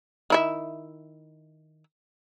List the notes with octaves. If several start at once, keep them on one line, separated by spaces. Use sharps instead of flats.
D#3 E4 E5